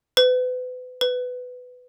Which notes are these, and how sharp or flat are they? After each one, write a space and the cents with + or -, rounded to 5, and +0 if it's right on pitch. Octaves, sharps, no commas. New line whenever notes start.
B4 +35
B4 +15